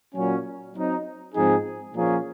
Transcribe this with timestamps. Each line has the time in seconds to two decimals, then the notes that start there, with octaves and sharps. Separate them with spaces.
0.15 A#2 F#3 C#4
0.74 F#3 C4 D#4
1.34 G#2 F3 C4 D#4 G#4
1.95 A#2 F3 A#3 C#4 G#4